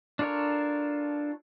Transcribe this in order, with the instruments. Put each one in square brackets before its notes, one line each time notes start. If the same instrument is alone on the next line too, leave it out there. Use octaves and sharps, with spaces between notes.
[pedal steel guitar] D4 F4 A4 A#4 C#5